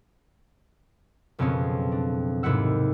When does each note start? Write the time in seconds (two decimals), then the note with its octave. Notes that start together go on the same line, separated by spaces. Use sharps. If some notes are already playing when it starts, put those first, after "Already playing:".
1.39 F#1 F2 B2 C4 C#4 G#4
1.92 D4
2.43 D#2 G#2 C3 E4 F#5 E6